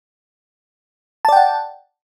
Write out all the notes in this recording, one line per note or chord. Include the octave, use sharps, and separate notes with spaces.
D5 F#5 G5 A5